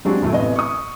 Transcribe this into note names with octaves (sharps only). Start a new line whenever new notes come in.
F#3 G#3 C4 D4 F#4 G4
D#1 F#2 F#3 A3
A1 C3 B3 D#5
C#6 D#6